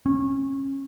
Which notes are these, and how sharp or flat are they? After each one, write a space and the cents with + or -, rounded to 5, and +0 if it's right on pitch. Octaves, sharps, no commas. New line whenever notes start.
C#4 -25